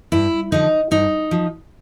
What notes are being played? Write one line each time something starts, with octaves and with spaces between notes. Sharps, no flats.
G2 E4
D3 F3 D#4
G2 D#4
F3